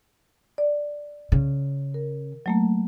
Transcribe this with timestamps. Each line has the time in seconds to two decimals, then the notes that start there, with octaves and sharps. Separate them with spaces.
0.58 D5
1.32 C#3
1.94 A#4
2.46 F#3 A3 A#3